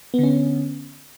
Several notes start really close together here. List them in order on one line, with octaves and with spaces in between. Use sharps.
B3 D3 C#4